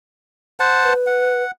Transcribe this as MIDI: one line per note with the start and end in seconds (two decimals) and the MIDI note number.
0.60 0.93 72
0.60 0.93 78
0.60 0.93 81
0.84 1.44 71
1.07 1.51 78